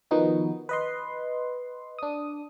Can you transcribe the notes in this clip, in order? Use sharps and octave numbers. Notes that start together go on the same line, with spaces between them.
D#3 F3 B3 D#4 F#4
B4 D#5 C6
D4 D#6